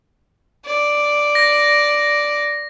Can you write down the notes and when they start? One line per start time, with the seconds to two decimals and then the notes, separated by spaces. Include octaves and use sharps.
0.65 D5
1.35 A#6